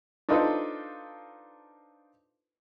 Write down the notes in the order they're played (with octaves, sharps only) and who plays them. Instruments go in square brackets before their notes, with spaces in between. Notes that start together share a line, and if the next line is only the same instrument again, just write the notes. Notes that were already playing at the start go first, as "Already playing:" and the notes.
[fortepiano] D4 D#4 F4 A4 B4 C5